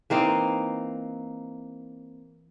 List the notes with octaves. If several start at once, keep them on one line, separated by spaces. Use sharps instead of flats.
E3 A#3 C4 D#4